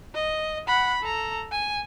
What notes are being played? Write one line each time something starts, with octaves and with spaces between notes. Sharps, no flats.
D#5
F#5 B5
A4 A#5
G#5